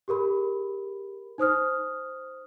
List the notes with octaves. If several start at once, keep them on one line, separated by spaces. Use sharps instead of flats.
G4 G#4 A#4 B5
D#4 C5 D#6 F6